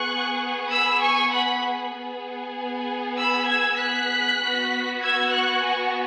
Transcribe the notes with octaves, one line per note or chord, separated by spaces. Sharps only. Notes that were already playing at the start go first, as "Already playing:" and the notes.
Already playing: B3 G#4 C#6 F#6
B5 E6
G#5 C#6
F#5 B5
B3 G#4
B5 E6
E6 G#6
F#6 B6
B3 F#4
E6 G#6
C#6 F#6
G#5 C#6